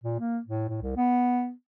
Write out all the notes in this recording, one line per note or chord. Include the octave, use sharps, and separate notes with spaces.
A#2
A#3
A2
A2
C2
B3